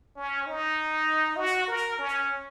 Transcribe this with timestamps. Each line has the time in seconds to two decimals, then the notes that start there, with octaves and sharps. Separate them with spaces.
0.17 C#4
0.47 D#4
1.37 F#4
1.68 A#4
1.99 C#4